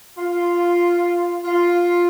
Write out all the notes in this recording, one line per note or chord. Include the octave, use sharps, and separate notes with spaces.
F4
F4